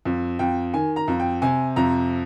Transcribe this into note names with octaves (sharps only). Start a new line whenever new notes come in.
F2
F2 G5
D#3 G#5
A#5
F2
G5
C3 G#5
F2 A#5